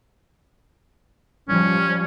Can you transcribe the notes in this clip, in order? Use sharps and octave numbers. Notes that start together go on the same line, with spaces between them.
F3 G3 C#4